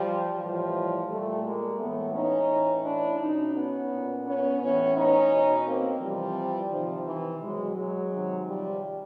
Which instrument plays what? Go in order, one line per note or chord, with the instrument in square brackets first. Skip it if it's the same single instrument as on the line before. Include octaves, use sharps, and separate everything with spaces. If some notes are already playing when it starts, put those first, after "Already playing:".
Already playing: [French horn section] F3 G3
A2 E3 F3 G3
A#2 G3 A3
G#3 A#3
A2 E3 A3 B3
C#4 D#4
A2 E3
D4 E4
B2 C#4 D#4
B3 C#4
A#2
B3 C#4
A2 E3 B3 C#4
C#4 D#4
B2
A#3 C4
C3 E3 F3 G3
C3 D#3 F3
E3
B2 F#3 G#3
F#3 G#3
C3 D#3
F3 G3